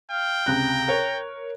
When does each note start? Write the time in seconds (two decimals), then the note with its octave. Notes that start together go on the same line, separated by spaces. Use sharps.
0.11 F5 G5
0.46 C#2 C3 A#5 F#6
0.88 A#4 C#5